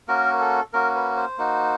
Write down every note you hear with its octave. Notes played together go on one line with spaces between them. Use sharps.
A#3 C#4 F#4 A#4
A4
A#3 C#4 F#4 A#4
B4
C5
A#3 D#4 F#4